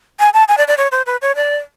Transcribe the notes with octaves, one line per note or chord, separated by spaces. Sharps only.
G#5
A5
G#5
D5
D5
C#5
C5
B4
C#5
D5